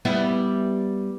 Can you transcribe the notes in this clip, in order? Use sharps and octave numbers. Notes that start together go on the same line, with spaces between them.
G3 B3 E4